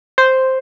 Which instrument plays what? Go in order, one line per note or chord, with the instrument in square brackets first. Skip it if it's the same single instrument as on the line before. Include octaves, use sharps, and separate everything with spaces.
[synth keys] C5